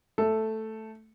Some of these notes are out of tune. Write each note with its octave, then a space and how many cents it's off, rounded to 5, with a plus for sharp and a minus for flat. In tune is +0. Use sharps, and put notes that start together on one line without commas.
A3 +0 A4 +0